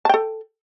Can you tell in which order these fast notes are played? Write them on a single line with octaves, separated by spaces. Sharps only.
A5 G5 A4